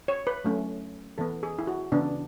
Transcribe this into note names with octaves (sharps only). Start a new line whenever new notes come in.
C#5
B4
F#3 A3 C#4
E3 B3 A4
G#4
E4
F#4
C#3 E3 B3 D4